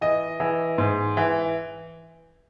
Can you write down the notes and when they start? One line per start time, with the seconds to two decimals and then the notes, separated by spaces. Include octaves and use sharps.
0.01 E3 D#5
0.40 E3
0.78 G#2
1.17 E3